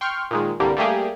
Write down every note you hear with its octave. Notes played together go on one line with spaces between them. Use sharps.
G5 C6 C#6 F6
A#2 D#3 G#3
C2 G2 D3 G3 A#3
G3 A3 A#3 G4 G#4